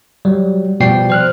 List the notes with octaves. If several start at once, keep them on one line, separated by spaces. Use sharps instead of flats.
F#3 G3
B2 F3 G3 D5 G5 C7
C5 F6 F#6